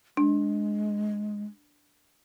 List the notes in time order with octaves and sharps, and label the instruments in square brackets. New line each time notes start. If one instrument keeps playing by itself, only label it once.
[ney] G#3 [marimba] D4